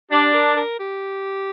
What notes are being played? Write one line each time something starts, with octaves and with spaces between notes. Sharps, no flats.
D4 G4
A#4
A#4
G4